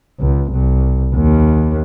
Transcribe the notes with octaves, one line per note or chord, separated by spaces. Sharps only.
C#2
C2
D#2